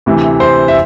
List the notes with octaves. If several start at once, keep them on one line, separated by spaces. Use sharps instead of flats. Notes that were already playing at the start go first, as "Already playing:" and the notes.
D2 C3 E3
C5
E5